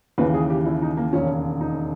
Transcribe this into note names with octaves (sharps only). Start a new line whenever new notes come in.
D#2 C#3 E3 B4
G#4
G4
E4
D#4
A#3
E1 D#2 C#3 C#4
D#4